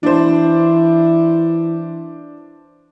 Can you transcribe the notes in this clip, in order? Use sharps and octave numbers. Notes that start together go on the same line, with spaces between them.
E3 D4 C5